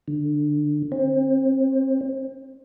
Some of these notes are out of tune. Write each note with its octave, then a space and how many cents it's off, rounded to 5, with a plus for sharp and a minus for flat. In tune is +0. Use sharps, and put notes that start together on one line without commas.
D3 +15
C4 +30